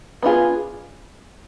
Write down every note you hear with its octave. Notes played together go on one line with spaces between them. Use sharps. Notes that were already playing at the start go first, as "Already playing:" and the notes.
B3 D4 F4 G#4